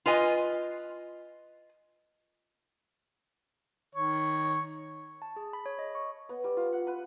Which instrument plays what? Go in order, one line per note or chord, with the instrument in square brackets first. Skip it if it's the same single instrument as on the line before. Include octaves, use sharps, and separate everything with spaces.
[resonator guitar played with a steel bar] F4 B4 D#5 G#5
[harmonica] D#3 C#5
[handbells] A5
G#4
B5
C#5
D#5
C#6
[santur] B3
G3
F4
F#5
B4